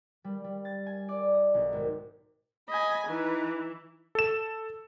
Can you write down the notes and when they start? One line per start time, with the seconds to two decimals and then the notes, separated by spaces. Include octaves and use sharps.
0.24 G3
0.44 G3
0.65 A6
0.86 G#5
1.09 D5
1.34 D#5
1.54 B1
1.73 G#1
2.69 D#5 G#5 B5
3.08 E3 D#4 B4
4.15 A4 E7